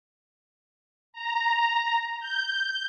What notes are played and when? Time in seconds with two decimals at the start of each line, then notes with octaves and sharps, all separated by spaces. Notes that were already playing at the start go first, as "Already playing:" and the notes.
1.13 A#5
2.20 G6